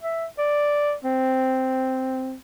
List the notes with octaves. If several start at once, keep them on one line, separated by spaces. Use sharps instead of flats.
E5
D5
C4